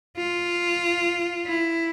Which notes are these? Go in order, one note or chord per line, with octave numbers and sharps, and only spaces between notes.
F4
E4